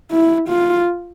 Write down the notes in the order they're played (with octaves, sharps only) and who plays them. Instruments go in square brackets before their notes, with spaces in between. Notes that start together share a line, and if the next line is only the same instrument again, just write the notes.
[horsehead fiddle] E4
F4